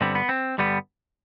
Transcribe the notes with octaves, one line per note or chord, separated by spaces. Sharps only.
G2 D3 G3 B3 C4
B3
C4
G2 D3 G3 B3